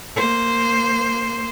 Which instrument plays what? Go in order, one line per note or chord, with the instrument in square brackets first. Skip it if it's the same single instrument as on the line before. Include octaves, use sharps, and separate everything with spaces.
[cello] A#3 C5